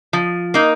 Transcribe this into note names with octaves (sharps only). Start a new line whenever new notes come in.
F3
A#3 D#4